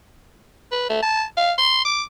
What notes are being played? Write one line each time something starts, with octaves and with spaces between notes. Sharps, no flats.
B4
A3
A5
F5
C6
D6